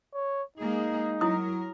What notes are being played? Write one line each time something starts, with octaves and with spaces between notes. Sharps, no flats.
C#5
G#3 A#3 D#4 G#4
F#3 E4 A#4 D#6